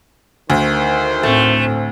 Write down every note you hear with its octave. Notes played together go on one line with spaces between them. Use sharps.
D2 D#3 C5
A2 A3 C4